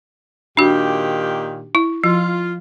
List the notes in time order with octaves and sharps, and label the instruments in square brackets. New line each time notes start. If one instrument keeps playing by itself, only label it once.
[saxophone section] A#2 D#3 G4 [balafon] D4 F#4
[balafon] E4
[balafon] F3 [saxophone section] F4